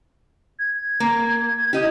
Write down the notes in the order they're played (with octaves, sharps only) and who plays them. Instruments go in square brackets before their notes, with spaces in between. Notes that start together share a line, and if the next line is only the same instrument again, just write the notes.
[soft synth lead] G#6
[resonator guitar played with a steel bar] A#3
[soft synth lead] E4 [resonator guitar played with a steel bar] G4 D#5